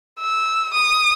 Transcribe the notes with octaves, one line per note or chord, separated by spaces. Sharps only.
E6
D#6